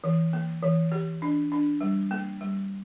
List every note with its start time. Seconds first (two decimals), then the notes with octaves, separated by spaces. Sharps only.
0.04 E3
0.33 A#3
0.63 E3
0.92 G4
1.22 D4
1.52 D4
1.81 G3
2.11 A#3
2.41 G3